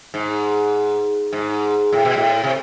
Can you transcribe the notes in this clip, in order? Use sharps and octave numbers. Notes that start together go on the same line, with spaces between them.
G#2
G#2
A2
B2
A2
C3